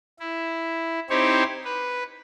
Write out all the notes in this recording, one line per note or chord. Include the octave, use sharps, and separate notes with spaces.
E4
C4 D#4 E4 G4 C5 C#5
B4